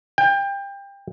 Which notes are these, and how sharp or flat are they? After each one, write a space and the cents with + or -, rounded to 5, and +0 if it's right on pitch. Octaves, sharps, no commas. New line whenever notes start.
G5 +25